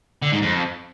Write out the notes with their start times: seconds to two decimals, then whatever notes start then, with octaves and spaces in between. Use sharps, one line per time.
0.22 D3
0.32 G#2
0.42 F2